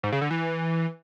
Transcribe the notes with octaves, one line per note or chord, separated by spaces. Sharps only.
G#2
C#3
D3
E3